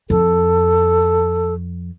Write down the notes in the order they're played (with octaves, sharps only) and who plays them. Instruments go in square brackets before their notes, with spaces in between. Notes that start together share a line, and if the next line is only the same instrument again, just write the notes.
[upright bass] F2 [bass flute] A4